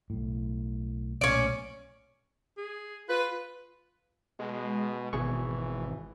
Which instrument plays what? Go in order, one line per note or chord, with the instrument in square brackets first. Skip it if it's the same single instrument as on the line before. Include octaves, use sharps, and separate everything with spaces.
[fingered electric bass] B1 A2
[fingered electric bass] B1 A#2 A3 [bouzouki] C#4 D5
[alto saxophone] G#4
[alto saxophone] F4 [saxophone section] B4
[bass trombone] B2 [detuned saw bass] G#3
[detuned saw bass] G#1 [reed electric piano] B2 G#4 C#6 [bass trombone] E3